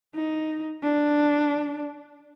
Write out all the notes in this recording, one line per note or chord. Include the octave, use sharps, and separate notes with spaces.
D#4
D4